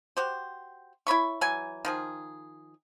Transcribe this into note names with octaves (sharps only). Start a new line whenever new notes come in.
F#4 G4 C5
E4 C#5 B5 C#6
E3 F#3 G#5
D#3 F3 G#4